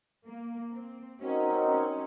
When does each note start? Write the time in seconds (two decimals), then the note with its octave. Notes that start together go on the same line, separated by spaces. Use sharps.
0.27 A#3
0.73 C4
1.21 C4 C#4 D#4 F#4 A#4 D#5
1.69 C#4